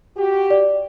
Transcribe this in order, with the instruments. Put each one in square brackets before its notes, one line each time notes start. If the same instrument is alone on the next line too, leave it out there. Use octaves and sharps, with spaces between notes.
[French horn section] F#4 G4
[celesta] D5